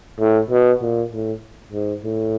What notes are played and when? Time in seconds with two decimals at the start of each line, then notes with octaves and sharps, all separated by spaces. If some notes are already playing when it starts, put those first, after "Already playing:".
0.19 A2
0.51 B2
0.81 A#2
1.11 A2
1.72 G#2
2.03 A2